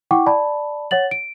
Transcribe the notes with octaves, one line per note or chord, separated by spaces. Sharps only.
E4 F#5 G5 C#6 D6
D5 A5 B5
C#5 F#5 A6 F#7
D7